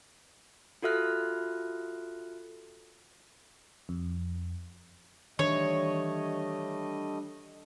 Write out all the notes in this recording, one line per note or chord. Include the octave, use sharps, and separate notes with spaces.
F4 F#4 A4 E5 F6 F#6
F2
D#3 E3 G3 A3 D4 C#5 D#5